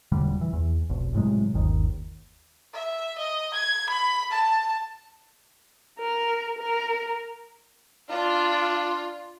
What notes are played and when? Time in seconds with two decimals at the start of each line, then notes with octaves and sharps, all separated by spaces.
0.12 E1 A#2 D3 G3
0.41 E3
0.53 E2
0.90 F1 B1
1.15 A2 C3 F#3 G#3
1.54 G1 D#2 D#3
2.74 E5
3.18 D#5
3.54 G#6
3.89 B5
4.31 A5
5.99 A#4
6.59 A#4
8.10 D4 F4